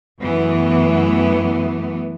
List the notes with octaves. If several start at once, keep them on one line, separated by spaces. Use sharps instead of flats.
F#2 E3 A3 B3